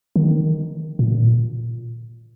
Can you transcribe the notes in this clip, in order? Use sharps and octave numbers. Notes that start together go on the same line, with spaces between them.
D#3
A#2